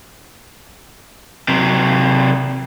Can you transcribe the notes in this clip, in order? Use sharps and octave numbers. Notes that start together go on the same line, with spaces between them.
C3 F#3